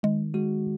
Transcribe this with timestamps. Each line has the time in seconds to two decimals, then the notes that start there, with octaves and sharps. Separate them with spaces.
0.03 D#3 G#3
0.34 G#3 F#4